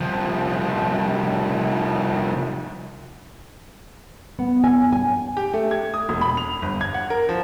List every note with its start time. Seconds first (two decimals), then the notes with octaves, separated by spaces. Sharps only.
0.01 C2 F3
4.39 B3
4.64 G#5
4.93 G#5
5.37 G4
5.54 A3
5.71 G#6
5.94 D#6
6.09 E1
6.21 B5
6.37 F7
6.62 G1
6.81 G#6
6.94 F#5
7.10 A#4
7.29 F3